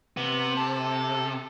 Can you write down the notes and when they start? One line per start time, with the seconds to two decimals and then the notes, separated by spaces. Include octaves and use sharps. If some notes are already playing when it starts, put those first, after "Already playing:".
0.17 C3 B3
0.57 A4